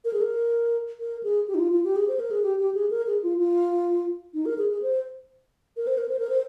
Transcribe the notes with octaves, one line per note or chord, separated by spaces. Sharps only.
A#4
G#4
A#4
A#4
G#4
G4
D#4
F4
F4
G4
G#4
C5
A#4
G#4
G4
G4
G#4
A#4
G#4
F4
F4
D#4
A#4
G#4
G#4
C5
A#4
C5
A#4
C5
A#4
C5